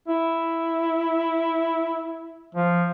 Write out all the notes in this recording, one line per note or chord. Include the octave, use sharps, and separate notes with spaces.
E4
F3